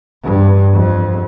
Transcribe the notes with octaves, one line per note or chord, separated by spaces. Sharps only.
G2
F2